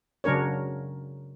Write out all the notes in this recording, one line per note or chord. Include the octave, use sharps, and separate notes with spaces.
C#3 F#3 D4 A#4 C#5